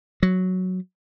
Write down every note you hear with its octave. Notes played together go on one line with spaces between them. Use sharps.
F#3